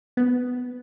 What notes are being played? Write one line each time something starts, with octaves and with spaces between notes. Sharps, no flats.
B3